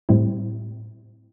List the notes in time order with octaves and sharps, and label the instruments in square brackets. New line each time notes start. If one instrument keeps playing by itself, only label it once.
[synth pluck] A2 G3 C4 E4